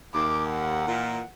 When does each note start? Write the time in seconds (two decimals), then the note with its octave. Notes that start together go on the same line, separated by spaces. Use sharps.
0.14 D#2 D6
0.48 F#5
0.88 A#2 E3